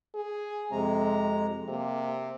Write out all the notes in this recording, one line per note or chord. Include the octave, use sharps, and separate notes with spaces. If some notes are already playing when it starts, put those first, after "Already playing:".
G#4
F2 C3 G#3 A#5
C3 A#3